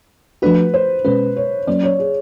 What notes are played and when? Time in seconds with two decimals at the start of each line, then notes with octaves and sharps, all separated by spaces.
0.42 F3 A3 D4 F#4 B4
0.74 C5
1.04 B2 G#3 C#4 B4
1.36 C#5
1.67 F#3 A#3 C#4 D5
1.83 C#5
1.99 G#4